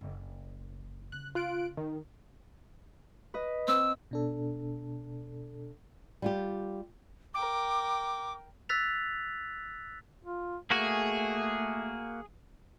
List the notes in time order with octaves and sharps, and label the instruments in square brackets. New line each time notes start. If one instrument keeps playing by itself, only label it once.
[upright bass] F#1
[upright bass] C#3 [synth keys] F#6
[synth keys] F4 F#6 D7
D#3
[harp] B4 D#5
[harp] C4 [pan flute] E6
[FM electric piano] B2 D4 A4
[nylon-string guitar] G3 F4 G4
[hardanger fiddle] A#4 G5 [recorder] D6
[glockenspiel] E6 F#6 A6 B6 F7
[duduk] F4
[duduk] A3 [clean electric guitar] A#3 F#4 [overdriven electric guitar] G#4